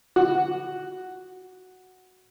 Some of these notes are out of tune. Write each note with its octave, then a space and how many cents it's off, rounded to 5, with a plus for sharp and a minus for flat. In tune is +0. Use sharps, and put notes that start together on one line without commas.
F#4 +0 F#5 +0